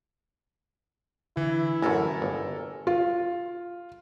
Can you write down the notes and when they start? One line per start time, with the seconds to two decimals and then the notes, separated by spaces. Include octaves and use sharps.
1.37 D3 E3 E4
1.82 A1 F#2 A4 A#4 G#5
2.22 G1
2.87 F4